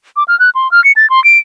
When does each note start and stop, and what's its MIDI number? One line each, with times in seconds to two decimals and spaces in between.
0.16 0.24 86
0.28 0.38 89
0.40 0.50 90
0.55 0.70 84
0.72 0.83 89
0.84 0.92 97
0.96 1.08 93
1.10 1.23 84
1.24 1.38 98